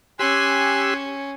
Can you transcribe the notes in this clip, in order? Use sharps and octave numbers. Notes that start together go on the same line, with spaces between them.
C#4 G4 G#5 C6 E6 F#6